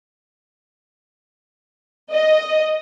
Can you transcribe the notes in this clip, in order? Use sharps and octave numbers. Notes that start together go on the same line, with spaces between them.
D#5